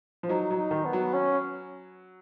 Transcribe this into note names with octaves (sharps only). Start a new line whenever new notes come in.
F3
F#3 D#4
F#3
D#4
D#3
B3
F#3
C#4